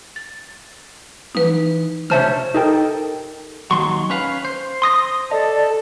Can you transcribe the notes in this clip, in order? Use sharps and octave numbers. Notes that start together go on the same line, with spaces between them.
A6
E3 D#4 B4
D2 C3 C#4 C5 E5 A5 F6
D#4 G4 A4 A#4 G5
D#2 F#3 C6 C#6
C#4 B4 F5
C5
C6 D#6 A#6
A4 D5 D#5